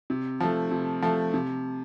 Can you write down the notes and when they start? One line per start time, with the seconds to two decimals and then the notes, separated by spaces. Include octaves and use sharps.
0.10 C3
0.40 F3 A3
0.71 C3
1.02 F3 A3
1.34 C3